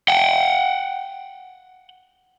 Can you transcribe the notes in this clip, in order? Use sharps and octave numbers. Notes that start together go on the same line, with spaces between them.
F#5 G5